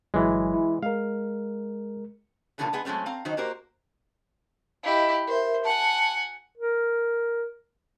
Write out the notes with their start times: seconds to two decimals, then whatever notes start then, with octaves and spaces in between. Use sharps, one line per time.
0.14 G1 E3 F#3 G#3
0.54 E4
0.83 G#3 A#4 F5
2.58 B2 D3 D#3 F3 G#3 A#3
2.73 G#3 B3 G#4
2.85 F#3 G#3 A3 C4 C#4
3.06 C4 F5 A#5
3.25 D#3 F#3 D#4 C5
3.37 A#3 F#4 G4 A#4 C5
4.83 E4 G4 D#5 F5
5.27 A#4 C5 E5
5.65 F#5 G#5 A5
6.58 A#4